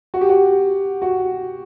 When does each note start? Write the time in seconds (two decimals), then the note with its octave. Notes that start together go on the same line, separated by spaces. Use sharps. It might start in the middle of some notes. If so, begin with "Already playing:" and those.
0.14 F#4
0.21 G4
0.29 F#4
1.02 F#4